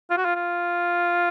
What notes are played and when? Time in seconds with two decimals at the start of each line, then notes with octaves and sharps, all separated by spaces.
0.11 F4
0.18 F#4
0.25 F4
0.36 F4